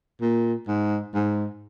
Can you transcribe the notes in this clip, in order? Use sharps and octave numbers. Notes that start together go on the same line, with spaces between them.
A#2
G#2
G#2